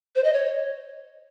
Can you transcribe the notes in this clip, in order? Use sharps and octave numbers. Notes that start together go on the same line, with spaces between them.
C5
D#5
C#5